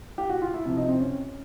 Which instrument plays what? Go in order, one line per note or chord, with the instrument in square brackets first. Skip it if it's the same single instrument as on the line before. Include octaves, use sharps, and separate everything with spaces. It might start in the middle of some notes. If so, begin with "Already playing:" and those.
[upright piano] G4
F#4
F4
E4
C3 F3
D#4
C4
C#4